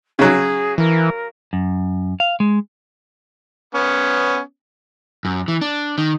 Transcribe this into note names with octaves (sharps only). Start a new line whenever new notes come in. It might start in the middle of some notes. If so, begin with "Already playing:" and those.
C#3 F#3 G#4
E3 A#4
F#2
F5
G#3
B3 C#4
F#2
E3
D4
D#3